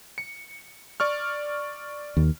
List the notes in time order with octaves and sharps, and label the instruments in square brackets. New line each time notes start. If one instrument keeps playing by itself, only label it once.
[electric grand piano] C#7
D5 C#6 F6
[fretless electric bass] D#2